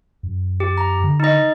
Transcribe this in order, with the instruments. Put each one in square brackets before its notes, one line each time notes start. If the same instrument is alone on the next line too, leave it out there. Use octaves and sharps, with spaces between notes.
[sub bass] F#2
[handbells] G4
A#5
[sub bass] D3
[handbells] D#4 D#5